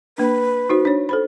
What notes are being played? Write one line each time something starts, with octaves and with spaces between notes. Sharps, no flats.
A#3 D4 B4
D#4 F#4 C5
D4 C#5
A4 C5 B5